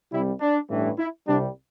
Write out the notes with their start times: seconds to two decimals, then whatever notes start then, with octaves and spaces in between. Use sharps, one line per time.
0.12 C2 C3 G3 E4
0.40 D4
0.69 A1 G2 E3
0.98 E4
1.27 C2 C3 G3 D4